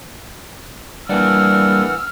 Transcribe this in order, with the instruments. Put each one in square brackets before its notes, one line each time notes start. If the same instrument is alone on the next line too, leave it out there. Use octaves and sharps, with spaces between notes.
[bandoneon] E3 F#5 [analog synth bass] G3 [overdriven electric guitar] A#3 D4 [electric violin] E6 F6